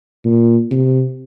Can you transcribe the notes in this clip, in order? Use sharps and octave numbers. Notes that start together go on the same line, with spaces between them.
A#2
C3